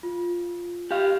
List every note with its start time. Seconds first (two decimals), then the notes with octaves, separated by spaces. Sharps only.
0.03 F4
0.91 G4 F5